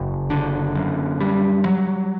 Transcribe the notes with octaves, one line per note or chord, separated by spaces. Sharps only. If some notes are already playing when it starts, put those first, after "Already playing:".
Already playing: F#1
D3
F#2
G3
F#3